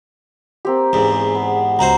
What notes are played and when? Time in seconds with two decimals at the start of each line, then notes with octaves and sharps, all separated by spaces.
0.65 A#3 C4 G4
0.93 E2 G#2
1.35 B3
1.79 C#2 F#4 C5 A#5